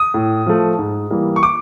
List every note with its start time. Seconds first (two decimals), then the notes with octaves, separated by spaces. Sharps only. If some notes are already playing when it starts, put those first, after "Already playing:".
Already playing: D#6
0.14 A2
0.46 F3 A3
0.79 G#2
1.10 E3 G3 A#3
1.36 C#6
1.43 D6